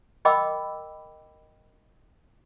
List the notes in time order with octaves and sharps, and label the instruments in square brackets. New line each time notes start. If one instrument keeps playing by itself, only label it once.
[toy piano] A#4 D#5 G5 B5 D6 E6